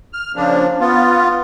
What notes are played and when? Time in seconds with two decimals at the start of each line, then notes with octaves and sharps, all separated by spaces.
0.13 F6
0.36 C#3 F3 A#3 D4
0.80 B3 F4